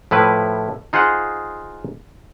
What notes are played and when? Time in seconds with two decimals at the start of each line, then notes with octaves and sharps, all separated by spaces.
0.11 A2 F3 E4 B4
0.93 D#4 F4 G#4 C5 F#5